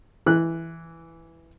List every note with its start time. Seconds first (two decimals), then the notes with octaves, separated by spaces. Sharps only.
0.26 E3 F#6